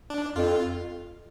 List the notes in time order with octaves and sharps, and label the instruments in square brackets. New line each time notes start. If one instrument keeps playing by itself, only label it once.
[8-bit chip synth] D4
[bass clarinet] F2 [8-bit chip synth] F4